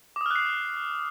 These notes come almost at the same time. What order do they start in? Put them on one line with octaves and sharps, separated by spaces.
D6 D#6 F6 F#6 C7